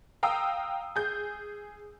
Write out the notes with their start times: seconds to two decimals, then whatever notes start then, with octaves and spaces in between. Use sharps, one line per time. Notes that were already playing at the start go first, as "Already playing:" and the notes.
0.23 F5 G5 A#5 D#6 E6
0.96 G#4 G6